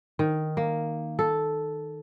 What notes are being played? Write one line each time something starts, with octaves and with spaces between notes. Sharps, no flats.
D#3
A#3
A4